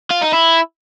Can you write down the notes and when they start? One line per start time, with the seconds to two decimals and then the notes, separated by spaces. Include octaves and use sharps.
0.11 F4
0.22 D#4
0.33 E4